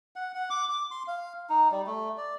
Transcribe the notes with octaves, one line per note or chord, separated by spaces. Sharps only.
F#5
F#5
D6
D6
C6
F5
D#4
G3
A3
D5